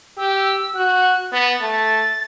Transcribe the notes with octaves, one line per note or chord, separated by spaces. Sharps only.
G4 E6
F#4 F#6
B3 A6
A3